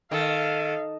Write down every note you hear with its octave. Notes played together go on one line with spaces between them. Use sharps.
D#3 A4 F5